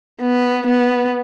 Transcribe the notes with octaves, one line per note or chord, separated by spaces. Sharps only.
B3
B3